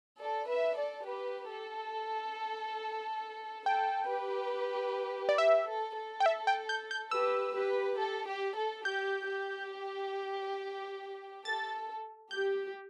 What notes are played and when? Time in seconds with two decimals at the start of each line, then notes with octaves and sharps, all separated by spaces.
0.19 A4 D5
0.48 B4 E5
0.77 A4 D5
1.06 G4 B4
1.50 A4
3.66 A4 G5
4.09 G4 B4
5.29 D5
5.38 G4 E5
5.68 A4
5.97 A4
6.20 G5
6.26 E5
6.47 G5
6.69 G6
6.91 G6
7.11 G4 B4 E6
7.55 G4 B4
7.99 A4
8.28 G4
8.56 A4
8.85 G4 G6
9.29 G4
11.45 A4 A6
12.31 G4 G6